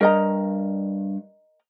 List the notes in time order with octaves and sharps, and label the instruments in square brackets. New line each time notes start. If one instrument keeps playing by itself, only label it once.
[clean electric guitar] G2 [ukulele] A#4 D#5 A#5